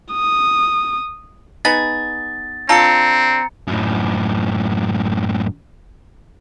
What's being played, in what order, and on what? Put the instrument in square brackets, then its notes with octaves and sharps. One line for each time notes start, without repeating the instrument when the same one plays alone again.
[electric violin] D#6
[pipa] B3 D#4 G#4 [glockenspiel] A6
[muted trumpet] C4 [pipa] D4 F4 A4 [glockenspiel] A#5 C#7
[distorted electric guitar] F#2 A2